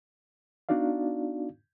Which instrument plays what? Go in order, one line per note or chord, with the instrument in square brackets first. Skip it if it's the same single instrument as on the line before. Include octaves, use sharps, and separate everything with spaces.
[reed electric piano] B3 D4 D#4 F#4 D5 F5